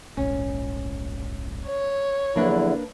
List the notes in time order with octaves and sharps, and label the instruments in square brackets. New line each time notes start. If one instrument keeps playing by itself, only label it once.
[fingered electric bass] D1 A#1 G#2 [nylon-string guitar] C#4
[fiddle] C#5
[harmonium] E2 D3 E4 [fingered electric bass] F3 F#3 [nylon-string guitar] A#3 D4 B4